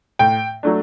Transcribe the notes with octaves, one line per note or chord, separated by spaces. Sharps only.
A2 G5
F#3 A3 D4